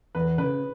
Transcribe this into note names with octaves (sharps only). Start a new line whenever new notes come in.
E2 B4
C#3 B4